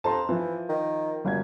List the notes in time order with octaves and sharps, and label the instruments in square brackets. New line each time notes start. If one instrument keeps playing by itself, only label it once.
[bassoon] F2 [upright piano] A5 A#5 C6
[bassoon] E3 [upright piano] F3
[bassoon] D#3
[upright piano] G1 G#6 [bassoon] F#2